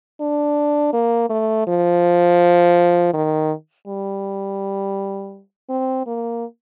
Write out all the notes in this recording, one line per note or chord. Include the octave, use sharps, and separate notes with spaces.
D4
A#3
A3
F3
D#3
G3
C4
A#3